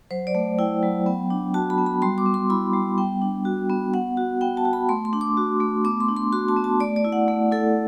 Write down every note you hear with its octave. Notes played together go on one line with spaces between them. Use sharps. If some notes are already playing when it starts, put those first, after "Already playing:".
F#3 C5
D5
A3
E4 G5
F#3
B3
D4
F#4 A5
B5
B3
B5
G3 C6
D6
B3
C6
E4 B5
G3
B3 G5
D4
F#4
B3
B3 F#5
F#4
B3 G5
A5
F#4
B5
A3 C6
C6
D4
D6
F#4
A3
B3 D6
C6
D4
C6
F#4 C6
A5
B3
A5
A3 D5
D5
E4
F#5
A3
E4 A4